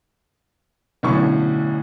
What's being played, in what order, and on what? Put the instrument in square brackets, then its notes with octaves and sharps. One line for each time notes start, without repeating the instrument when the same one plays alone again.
[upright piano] B1 A2 D3 C#4 C#6